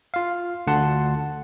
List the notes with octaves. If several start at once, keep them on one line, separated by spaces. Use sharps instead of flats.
F4 F5
D2 D3 F#5 A5 C6